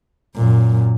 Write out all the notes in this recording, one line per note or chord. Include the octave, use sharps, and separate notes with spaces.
F#2 A#2